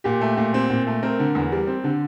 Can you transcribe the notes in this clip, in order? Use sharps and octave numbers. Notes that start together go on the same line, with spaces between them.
A#2 G4
A3
A#2
C4
A#2
A3
C4 A#4
D3
E2
G3
C4
D3